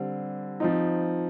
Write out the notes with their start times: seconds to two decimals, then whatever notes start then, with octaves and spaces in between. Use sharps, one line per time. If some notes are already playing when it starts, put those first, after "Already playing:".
Already playing: D3 G3 C4
0.60 F3 C4 D#4